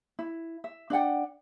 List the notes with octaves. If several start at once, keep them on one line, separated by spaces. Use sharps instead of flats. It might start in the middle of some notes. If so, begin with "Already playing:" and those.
E4
E5
D4 D5 F#5 G5